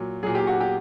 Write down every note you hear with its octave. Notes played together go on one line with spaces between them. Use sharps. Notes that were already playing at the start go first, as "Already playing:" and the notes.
Already playing: A#2 F#3
A#2 F#3 G#4
G4
F#4
G4